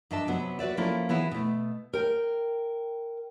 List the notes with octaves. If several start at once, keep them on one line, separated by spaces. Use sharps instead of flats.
G2 D4 D#5 E5 A5
C3 F#3 B3
F#4 B4 D5 E5
F3 A#3 C#4 E4 A4
E3 B3 E4 G#4
B2 A3
A#4 G5